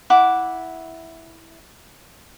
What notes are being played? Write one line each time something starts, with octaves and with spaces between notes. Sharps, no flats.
E4 F#5 D6